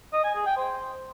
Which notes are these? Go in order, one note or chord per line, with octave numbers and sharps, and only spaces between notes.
D#5
G#5
G#4
G5
C5